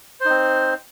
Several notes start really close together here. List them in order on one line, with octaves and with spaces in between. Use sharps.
C5 D#4 C4